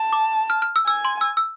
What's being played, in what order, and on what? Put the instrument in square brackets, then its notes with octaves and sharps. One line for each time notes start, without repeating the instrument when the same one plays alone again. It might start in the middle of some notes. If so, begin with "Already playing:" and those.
Already playing: [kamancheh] A5
[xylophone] D6
F6
F6
E6
[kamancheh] G#5 [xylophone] E6
[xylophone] C6
E6
E6